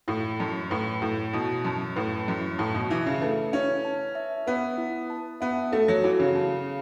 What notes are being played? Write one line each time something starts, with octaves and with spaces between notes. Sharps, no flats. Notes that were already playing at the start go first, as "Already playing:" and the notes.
A2 E4
F#2 A5
A2 B4
A2 E4
B2 E4
F#2 A5
A2 B4
F#2 E4
A2 A5
B2
E3 E5
C#3
A3 B4
C#4 E4
A5
E5
B3 B4
E4
A5
B3 E5
A3 A4
F#3
E3 F#4
C#3
A5